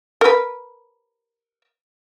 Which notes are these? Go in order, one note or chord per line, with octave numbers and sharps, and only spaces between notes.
A#4 B4